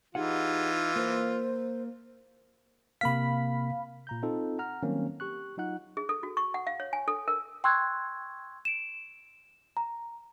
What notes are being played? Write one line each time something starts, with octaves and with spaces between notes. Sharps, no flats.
E3 D#4 F4 G4 G#4 F#5
A#3 A#4 C5
C3 A#3 F5 B5 B6
A#2 A#5 G6
C4 D#4 F4 A4
F#5 A#5 F6
D#3 F#3 G3 A#3 C4 C#4
G4 C#6 F#6
F#3 D#4 F4 F#5 F#6
G#4
A4
F#4
C#6
F#5
F5
C#5
G#5
A4
A#4
G5 C6 C#6 E6 F#6 G#6
D7 E7
A#5